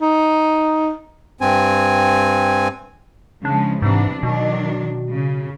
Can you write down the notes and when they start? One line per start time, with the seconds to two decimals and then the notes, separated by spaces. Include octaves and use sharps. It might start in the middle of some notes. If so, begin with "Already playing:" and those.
0.01 D#4
1.41 G2 C4 G#5
3.45 C#3 F3 G#3 D4
3.82 G#2 C3 E3 D4
4.23 B2 D#3 F#3 D4
5.11 C#3